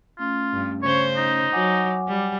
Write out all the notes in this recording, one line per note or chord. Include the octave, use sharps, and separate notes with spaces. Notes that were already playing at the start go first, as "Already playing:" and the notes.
A3 C#4 F4
G2
C#3 C5 C#5
D#4
F#3 F#5 G#5 D6
G3